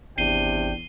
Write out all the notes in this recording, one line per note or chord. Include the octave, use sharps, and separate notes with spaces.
G#1 E2 C3 D4 G5 C7 D#7 G7